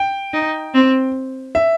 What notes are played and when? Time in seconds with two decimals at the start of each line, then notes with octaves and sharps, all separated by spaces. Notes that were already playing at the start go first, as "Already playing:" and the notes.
Already playing: G5
0.33 D#4
0.74 C4
1.55 E5